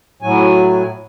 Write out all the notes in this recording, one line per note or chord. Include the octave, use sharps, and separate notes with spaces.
A2 F#3 G#5